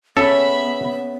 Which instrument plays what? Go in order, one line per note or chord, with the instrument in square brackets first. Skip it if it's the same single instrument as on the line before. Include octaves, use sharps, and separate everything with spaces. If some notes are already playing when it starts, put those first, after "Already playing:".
[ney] B3 [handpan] C#4 [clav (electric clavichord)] A4 [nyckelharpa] E5 B5